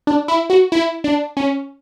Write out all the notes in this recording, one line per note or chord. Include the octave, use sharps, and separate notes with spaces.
D4
E4
F#4
E4
D4
C#4